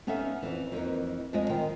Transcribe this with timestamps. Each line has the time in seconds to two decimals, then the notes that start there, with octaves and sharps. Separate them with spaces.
0.07 B3 C#4 D#4 A4 E5 F5
0.43 F2 E3
0.72 F2 E3 A3 A#3 D#4
1.33 F2 F3 G#3 F4 D#5
1.49 D#3 F4 C5 G5